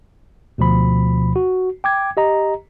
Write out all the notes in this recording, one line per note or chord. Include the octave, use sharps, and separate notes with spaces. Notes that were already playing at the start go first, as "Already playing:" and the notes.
D2 B2 F3 B5
F#4
G5 D6 G#6
G4 D#5 A#5